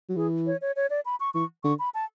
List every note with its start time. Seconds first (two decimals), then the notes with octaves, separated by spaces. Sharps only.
0.10 F#3
0.16 E3 G#4
0.47 C#5
0.61 C#5
0.76 C#5
0.90 D5
1.05 B5
1.20 C#6
1.34 E3 C#6
1.64 D3 C#6
1.79 B5
1.94 A5